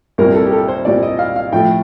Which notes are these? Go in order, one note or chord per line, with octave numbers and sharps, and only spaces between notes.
C2 A#2 G3 A#4
A4
G4
A4
C5
C2 A#2 G3 D5
D#5
F5
F5
A2 F3 A3 G5